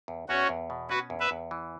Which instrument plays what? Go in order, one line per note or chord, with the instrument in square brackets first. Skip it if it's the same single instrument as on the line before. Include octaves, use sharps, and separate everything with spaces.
[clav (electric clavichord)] E2
[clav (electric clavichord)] E2 [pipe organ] C#4 F#4
[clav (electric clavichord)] E2
B2
[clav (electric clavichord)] C#4 [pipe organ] F#4 B4
[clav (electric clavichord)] E2
[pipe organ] B4 E5
[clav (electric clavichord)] E2
E3